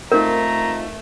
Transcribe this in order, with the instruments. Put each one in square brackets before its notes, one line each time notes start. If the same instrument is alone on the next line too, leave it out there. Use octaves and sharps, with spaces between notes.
[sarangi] A3 [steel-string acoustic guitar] C4 D#4 F4 [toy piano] A#4 [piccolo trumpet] A#5